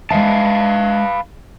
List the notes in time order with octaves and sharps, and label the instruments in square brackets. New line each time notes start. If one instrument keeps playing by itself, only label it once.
[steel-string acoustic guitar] G#3 E5 [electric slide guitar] B4 F5 A5